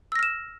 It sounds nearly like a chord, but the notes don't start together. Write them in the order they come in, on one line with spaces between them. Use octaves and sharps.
E6 A#6 F6 E7